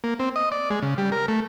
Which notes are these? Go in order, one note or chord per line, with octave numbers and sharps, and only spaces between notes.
A#3
C4
D#5
D5
G#3
C#3
G3
A#4
A3